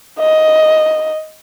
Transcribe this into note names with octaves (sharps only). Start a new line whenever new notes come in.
D#5